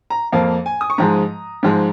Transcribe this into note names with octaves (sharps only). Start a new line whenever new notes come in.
A#5
F2 F3 A#3 F5
G#5
D#6
C#6
G#2 F3 G#3 A#5
G#2 F3 G#3